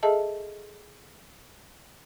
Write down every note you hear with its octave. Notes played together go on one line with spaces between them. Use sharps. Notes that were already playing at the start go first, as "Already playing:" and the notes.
G#4 A4 D#5 E5 A5